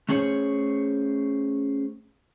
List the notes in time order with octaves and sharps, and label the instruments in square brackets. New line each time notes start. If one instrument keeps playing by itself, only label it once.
[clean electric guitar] A3 C#4 G#4 C5 C#5